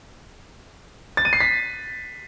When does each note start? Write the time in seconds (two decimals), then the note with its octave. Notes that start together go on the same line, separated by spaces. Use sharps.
1.17 A6
1.25 D#7
1.33 C7
1.40 B6